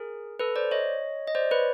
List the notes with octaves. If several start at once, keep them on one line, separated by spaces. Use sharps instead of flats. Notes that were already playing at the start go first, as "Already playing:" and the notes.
Already playing: G#4 A#4
A4 B4
C5 D5
C#5 D#5
D#5
C5 D5
B4 C#5